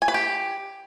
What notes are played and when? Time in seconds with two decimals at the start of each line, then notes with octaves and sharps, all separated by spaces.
0.02 G#5
0.08 B4
0.14 G4